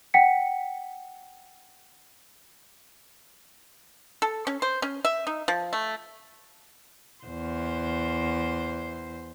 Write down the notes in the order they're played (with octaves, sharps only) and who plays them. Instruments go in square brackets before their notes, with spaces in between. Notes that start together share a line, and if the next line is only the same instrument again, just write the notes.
[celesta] F#5 G5 B6 C#7
[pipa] A4
C#4
C5
C#4
E5
D#4
F3
A3
[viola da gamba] E2 C5